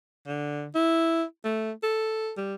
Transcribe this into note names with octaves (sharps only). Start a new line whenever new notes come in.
D3
E4
A3
A4
G3